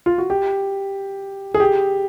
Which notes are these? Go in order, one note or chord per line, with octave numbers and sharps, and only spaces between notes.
F4
F#4
G4
G#4
G4